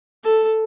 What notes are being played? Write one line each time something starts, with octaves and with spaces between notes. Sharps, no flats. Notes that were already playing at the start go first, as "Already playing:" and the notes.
A4